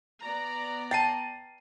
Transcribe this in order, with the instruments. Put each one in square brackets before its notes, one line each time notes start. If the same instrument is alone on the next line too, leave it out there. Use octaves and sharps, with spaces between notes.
[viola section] B3 D5 A#5
[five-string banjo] G5 A5 [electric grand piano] A6 C7 D#7